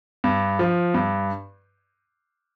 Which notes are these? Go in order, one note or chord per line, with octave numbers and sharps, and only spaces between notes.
G2
F3
G2